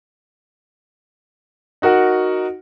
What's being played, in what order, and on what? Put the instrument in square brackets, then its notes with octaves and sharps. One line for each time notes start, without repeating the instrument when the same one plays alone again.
[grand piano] D#4 F#4 A#4 F#5